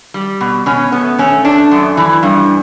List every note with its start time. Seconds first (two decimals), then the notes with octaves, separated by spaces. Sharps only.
0.14 G3
0.41 B2
0.66 B2 C#4
0.92 A3 B3
1.18 A3 C#4
1.44 A3 D4
1.71 F#2
1.97 E3
2.23 G2